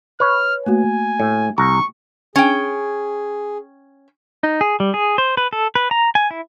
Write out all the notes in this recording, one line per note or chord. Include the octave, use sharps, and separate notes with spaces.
B4 C#5 F6
A3 A#3 F#4 G#5
A2
C2 A#5 C#6
C#4 G#4 G5
D#4
G#4
G3
G#4
C5
B4
A4
B4
A#5
G#5
E4